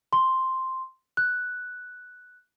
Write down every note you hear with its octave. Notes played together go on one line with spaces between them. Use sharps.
C6
F#6